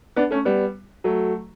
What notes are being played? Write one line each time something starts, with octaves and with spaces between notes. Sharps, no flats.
B3 D4
A3 C#4
G3 B3
F#3 A3